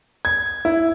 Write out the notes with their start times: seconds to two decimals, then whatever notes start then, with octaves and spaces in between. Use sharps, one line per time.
0.25 G#6
0.65 E4